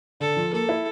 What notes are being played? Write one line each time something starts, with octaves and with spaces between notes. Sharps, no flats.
D3 A4
F3
A#3 A4
E4